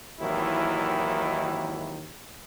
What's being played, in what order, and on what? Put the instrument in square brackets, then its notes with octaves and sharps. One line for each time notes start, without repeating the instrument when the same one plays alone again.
[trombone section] G#1 D#2 D#3 E3 F#3 E4